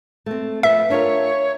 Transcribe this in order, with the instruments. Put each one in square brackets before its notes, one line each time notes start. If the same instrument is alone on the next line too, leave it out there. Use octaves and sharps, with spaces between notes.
[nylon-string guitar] A3 C4
[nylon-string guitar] F3 B4 [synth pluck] E5
[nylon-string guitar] D4 F4 A#4 [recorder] C#5